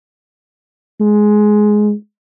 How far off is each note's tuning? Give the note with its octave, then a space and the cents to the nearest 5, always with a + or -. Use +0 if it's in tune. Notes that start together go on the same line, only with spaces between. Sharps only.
G#3 +10